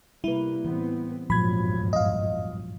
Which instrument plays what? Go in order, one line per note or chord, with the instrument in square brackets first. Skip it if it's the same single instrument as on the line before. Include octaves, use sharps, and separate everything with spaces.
[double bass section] C3 A#3 [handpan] G3 B4 [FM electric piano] E4
[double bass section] A2 B3 C4 [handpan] E3
[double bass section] G#1 E2 G2 [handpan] A#2 F3 F#3 [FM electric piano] B5 G#6
[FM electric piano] D#5 F5